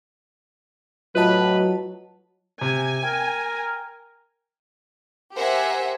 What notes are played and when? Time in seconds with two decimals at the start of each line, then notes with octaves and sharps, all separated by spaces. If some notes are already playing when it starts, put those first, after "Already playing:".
1.16 A2 F#3 F4 B4 D#5 A5
2.61 C3 G#5
3.03 A#4 G5
5.34 G4 A#4 C5 E5 F#5 G#5